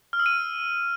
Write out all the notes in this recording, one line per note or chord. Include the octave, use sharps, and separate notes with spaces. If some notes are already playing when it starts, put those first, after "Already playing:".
F6
E6
D#7